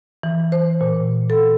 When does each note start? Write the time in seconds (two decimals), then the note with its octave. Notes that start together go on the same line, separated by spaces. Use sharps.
0.23 E3
0.52 C5
0.81 A#2
1.30 A4